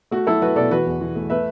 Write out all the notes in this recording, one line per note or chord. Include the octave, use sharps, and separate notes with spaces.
A3 F#4
F#3 E4 A4
F#3 F#4 B4
B2 A4 D5
E3 F#4 B4
E2
E3
A3
A3 B4 E5